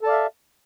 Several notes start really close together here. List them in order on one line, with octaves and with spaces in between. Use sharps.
A4 A5 D5 F5 E5